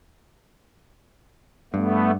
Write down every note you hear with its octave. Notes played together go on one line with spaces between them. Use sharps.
G2 A3 B3